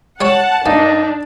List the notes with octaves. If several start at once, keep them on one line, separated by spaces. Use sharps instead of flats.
G3 C#5 F#5 A5
G2 A#3 D4 D#4 A5